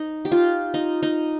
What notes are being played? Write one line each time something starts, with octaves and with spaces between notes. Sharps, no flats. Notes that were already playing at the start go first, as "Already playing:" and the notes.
Already playing: D#4
G4
F4
D#4
D#4